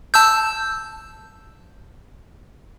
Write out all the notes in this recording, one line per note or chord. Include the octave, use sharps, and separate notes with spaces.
A5 E6 G6